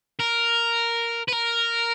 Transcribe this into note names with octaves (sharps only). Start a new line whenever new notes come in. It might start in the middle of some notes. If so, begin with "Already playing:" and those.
A#4
B4
A#4